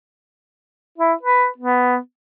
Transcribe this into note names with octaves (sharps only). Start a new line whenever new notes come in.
E4
B4
B3